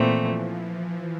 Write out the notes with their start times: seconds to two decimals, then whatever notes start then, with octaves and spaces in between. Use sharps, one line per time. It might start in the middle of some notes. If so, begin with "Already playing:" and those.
Already playing: A#2 E3 A3 C4
0.12 F3